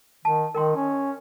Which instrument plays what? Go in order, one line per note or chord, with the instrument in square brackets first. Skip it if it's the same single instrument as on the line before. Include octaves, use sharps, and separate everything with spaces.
[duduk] D#3 [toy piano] A5
[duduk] D#3 [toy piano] A#4 G5 C6
[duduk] C#4